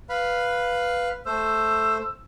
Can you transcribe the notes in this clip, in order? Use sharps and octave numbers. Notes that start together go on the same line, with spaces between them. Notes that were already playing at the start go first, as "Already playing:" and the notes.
B4 F5 B5
A3 C5 E6